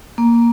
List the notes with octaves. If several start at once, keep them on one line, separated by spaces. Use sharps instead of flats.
A#3